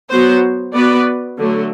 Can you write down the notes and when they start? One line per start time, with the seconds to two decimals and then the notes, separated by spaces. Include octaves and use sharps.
0.10 F#3 B3 F#4 C5
0.74 B3 F#4 B4 D5
1.38 D3 F#3 A3